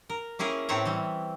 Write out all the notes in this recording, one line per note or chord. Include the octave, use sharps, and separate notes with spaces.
A#4
A#3 C#4 E4 G#4 A#4
A2 C4 B4 C#5 E5 A#5
E3 G3